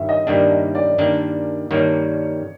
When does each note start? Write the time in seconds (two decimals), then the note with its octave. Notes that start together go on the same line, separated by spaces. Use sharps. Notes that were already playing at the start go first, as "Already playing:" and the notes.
Already playing: G2 D#3 C#5 E5
0.09 D#5
0.27 G2 D#3 G3 A#3 D4 D5
0.51 D#5
0.75 D5
0.98 G2 D#3 G3 A#3 D4
1.71 G2 D#3 G3 A#3 D4 C#5